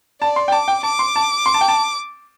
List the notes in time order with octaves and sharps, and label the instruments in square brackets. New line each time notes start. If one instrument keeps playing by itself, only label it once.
[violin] D5 [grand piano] A5
[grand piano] C6
G5
[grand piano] A5 [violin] D6
[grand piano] G5
[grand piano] A5 [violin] D6
[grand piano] C6
A5
C6
A5
G5
A5